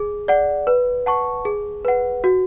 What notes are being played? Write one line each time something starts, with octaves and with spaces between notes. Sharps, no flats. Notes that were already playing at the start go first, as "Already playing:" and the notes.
Already playing: G#4
D5 F#5
B4
F#5 A5 C#6
G#4
B4 F#5
F#4